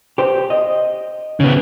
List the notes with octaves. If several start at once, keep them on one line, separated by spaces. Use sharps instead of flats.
G4 C5
D#5
C#3 B3